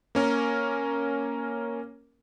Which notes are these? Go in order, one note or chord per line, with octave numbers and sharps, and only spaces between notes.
A#3 C#4 A#4